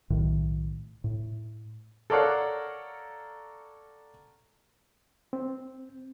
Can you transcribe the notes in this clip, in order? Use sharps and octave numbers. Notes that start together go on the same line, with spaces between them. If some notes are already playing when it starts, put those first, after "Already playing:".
B1 A2 D#3
A2
A4 A#4 C#5 D5 F5 F#5
C4